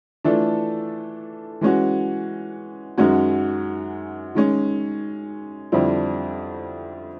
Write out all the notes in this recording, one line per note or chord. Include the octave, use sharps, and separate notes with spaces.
E3 A3 D4 F4 A4
E3 G#3 C#4 F#4
F#2 D#3 G#3 C#4 F#4
D#3 G#3 C#4
F2 D3 G3 C4 E4